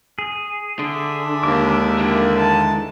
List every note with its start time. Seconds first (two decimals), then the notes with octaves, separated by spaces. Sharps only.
0.19 G#4
0.79 D3 D4 E5
1.43 D#2 G#3 D6
1.99 D3 E3
2.36 D#4 A5